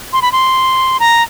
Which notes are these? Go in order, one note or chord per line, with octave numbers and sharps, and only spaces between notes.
C6
B5
C6
A#5